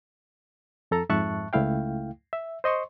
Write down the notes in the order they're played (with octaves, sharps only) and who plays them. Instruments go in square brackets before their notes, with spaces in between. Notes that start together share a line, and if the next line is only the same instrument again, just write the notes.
[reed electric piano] F2 A4 A#5
F2 G#2 E5 A5 C#6 F#6
C#2 A3 E4 F5 G5
E5
C5 D#5 C6 C#6